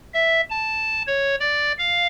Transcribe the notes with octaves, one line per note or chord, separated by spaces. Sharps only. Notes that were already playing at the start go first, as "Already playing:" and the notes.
E5
A5
C#5
D5
F5